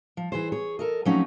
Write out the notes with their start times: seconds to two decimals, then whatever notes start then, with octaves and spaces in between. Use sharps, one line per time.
0.17 F3
0.32 E3 G#4 C5
0.52 G#4 C#5
0.79 A4 A#4 D#5
1.05 F3 F#3 A3 C4 C#4 D#4